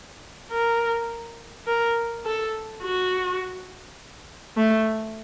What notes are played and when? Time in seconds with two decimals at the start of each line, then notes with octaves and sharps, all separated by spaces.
0.51 A#4
1.66 A#4
2.26 A4
2.83 F#4
4.57 A3